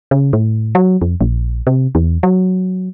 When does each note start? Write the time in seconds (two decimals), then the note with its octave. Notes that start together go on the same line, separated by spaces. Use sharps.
0.11 C#3
0.33 A2
0.75 F#3
1.02 F2
1.21 A#1
1.67 C3
1.95 E2
2.23 F#3